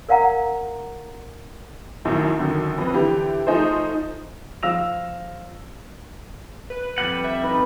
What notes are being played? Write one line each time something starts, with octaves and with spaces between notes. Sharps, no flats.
A#4 D5 F5 F#5 A#5
A#1 F#2 A2 D#3
F#2 D3 D#3
F2 B4
D3 E3 G4
F3 A3 D#4 G#4 C5
F3 F5 E6 A#6 F7
B4
F2 G3 F#5
E5
D#4 B4